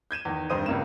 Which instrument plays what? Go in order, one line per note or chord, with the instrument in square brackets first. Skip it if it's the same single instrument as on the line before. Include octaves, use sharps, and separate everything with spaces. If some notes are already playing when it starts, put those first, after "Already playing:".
[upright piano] G6 G#6 D#7 E7
E2 D#3
F1 G2 D#3 C5 D#6 D#7
C#2 C#3 A#3 E7